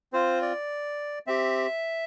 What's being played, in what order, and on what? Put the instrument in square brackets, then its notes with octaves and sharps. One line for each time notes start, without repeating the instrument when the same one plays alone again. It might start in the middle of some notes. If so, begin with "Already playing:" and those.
[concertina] C4 F4 C5
D5
C4 G4 E5